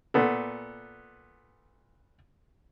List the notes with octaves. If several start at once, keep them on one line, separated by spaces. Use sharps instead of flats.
A#2 B3 A4